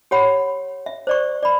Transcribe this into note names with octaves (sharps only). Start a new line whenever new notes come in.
G4 C#5 F#5 B5
E5
C5 D5 C#6
D5 B5